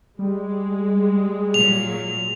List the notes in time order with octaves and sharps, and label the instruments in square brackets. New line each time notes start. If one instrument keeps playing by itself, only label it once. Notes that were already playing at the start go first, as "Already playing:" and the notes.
[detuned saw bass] G3 [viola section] G#3
[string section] A#2 F#3 [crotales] F7